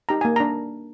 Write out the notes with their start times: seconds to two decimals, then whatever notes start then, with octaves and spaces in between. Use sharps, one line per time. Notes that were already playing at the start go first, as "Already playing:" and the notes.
0.09 D#4 G4 A#5
0.21 A#3 G#5
0.36 D4 A#5